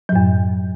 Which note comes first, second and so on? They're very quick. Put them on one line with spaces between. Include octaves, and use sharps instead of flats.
F#3 A2 F#2